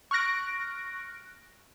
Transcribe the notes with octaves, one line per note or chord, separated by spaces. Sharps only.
C#6 F6 F#6 A#6 D7